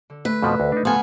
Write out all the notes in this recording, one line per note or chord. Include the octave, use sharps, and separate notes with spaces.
D3
A3 B4
F2 B2 F3 A4 F#6
D2
D4 D#4
F3 B3 A4 F5 F#5 G#5 B5